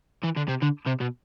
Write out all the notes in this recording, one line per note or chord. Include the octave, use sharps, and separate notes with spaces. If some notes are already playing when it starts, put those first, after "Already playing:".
E3
D3
C3
D3
C3
B2